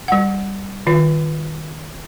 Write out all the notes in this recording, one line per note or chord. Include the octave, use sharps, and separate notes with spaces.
G3 F#5
D#3 F4